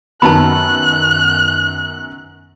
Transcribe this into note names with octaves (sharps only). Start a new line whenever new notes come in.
F#2 D#3 B3 A5 B5 F#6